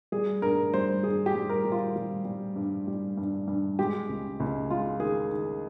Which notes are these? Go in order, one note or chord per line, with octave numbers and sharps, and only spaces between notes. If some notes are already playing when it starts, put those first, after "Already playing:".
G3 G#4
G2 A#4
G3 C5
G2 G#4
G4
G3
A#4
G3
F4
G3
G3
G2
G3
G2
G2
G#3 G4
C#2
C#2
G#3 F4
D#3 G#4
D#3